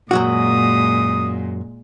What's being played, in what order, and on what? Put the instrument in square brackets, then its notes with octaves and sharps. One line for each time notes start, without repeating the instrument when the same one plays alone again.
[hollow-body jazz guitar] F#2 F#3 F#4 [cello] A#2 G#3 [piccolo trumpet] D#6